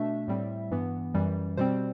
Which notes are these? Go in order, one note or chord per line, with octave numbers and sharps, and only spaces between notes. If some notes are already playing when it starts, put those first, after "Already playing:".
Already playing: B2 A3 D4 E5
A2 G3 C4
G2 E3 B3
F#2 E3 G3
B2 G3 C4 C5